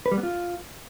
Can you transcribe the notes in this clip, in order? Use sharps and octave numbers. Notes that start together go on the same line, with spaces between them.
B4
G3
B3
F4